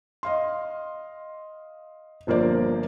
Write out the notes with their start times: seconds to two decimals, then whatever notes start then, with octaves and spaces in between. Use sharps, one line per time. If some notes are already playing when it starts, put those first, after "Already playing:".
0.23 D#5 F5 C6
2.27 G1 F3 A#3 C5 D5